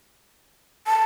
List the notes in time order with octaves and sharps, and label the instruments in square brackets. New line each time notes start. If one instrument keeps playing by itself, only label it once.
[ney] A5